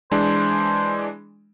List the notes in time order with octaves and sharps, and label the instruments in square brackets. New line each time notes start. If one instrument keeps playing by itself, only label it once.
[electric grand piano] E3 G#3 D4 [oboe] C5